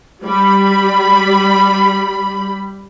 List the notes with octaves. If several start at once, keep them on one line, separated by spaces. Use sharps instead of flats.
G3 B5